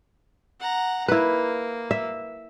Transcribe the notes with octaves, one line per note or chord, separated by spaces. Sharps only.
F#5 A#5
A#3 E4 B4
E5